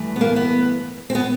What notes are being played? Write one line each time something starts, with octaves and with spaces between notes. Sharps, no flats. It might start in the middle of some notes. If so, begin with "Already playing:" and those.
Already playing: G2 E3 A3
B3
A#3
B3
C4
B3